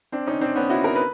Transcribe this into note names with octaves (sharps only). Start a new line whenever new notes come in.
C4 D4
C#4 D#4
C4 D4
B3 C#4
E4 F#4
A#4
B4